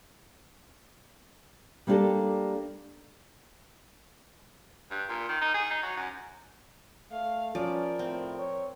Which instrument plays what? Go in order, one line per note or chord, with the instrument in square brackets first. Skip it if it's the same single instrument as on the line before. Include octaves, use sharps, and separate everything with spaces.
[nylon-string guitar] G3 A#3 B3 D4 G4 A4
[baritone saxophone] G2
A#2
D#3
D#4
G#4
D#4
F#3
F#2
[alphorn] A3 [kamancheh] F5
[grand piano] F3 [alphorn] C#4 [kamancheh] A#4 [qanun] D5
[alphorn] A2 [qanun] C4
[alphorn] C#5